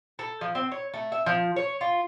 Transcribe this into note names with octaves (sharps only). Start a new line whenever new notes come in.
A4
F3
C4
C#5
A3
E5
F3
C#5
F4